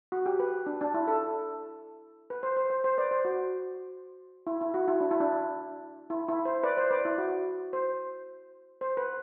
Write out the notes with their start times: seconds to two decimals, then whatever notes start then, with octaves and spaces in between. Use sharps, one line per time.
0.12 F#4
0.26 G4
0.40 B4
0.66 D4
0.81 D4
0.94 E4
1.07 A4
2.30 B4
2.43 C5
2.57 C5
2.70 C5
2.84 C5
2.98 B4 D5
3.11 C5
3.25 F#4
4.47 E4
4.61 E4
4.74 F#4
4.88 E4
5.00 D4
5.11 E4
5.20 D4
6.10 E4
6.28 E4
6.45 C5
6.63 B4 D5
6.77 C5
6.91 B4 D5
7.05 E4
7.18 F#4
7.73 C5
8.81 C5
8.97 B4